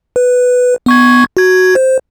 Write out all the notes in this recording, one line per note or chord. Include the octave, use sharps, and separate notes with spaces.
B4
B3 C#6 G#6
F#4 G#6
C5